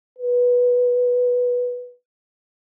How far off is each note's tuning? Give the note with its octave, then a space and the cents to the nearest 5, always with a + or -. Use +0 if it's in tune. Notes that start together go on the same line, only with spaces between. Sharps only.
B4 -10